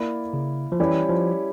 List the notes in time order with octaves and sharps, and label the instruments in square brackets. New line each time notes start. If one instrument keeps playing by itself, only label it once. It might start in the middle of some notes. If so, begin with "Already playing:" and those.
Already playing: [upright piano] A#3 E4 A#4 D5
[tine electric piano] C#3
F3
[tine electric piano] E3 [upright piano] G3 C#4 E4 G4 D5
[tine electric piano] F3